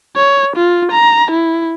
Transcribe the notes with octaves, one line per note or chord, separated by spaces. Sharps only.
C#5
F4
A#5
E4